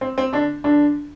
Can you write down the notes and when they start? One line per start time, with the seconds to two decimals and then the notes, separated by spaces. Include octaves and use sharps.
0.01 C4
0.18 C4
0.33 D3 D4
0.64 D3 D4